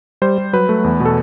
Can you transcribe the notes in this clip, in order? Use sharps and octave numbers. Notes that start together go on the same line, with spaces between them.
G3 C5
G3
F#3 B4
A3
E2
B2
A4